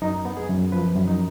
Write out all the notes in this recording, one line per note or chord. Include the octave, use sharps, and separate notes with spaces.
F#2 D#4
B3
G#4
F#2
F3 B4
F#2
D#4